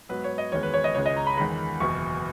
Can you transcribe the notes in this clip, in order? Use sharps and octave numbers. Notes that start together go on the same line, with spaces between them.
G#2 F#3 B3 B4
C#5
D#5
F#1 E2 D#3 G#3 B3 C#5
B4
C#5
D#5
C#2 C#3 G#3 C#5
D#5
A#5
B5
E2 D#3 G#3 B5
F#1 E2 B2 C#6